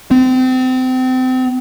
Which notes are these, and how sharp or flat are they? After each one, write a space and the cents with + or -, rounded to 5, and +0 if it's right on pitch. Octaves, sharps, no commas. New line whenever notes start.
C4 -30